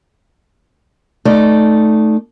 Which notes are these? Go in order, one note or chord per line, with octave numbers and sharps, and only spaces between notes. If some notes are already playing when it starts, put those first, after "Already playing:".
A3 D#4 D5